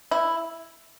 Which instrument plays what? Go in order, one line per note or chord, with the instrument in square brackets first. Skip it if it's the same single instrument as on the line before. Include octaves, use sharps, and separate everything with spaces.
[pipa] E4